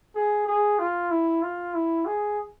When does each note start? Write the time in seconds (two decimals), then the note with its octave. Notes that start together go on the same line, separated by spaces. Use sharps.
0.15 G#4
0.46 G#4
0.79 F4
1.10 E4
1.42 F4
1.74 E4
2.05 G#4